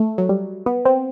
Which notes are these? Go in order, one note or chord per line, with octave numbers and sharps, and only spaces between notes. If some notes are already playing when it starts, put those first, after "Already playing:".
Already playing: A3
F#3
G3
B3
C4